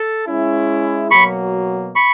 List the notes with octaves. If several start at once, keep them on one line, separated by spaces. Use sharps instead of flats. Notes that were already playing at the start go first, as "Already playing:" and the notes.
Already playing: A4
G#3 C#4 E4
B2 F#3 A#3 B5 C#6
B5 C#6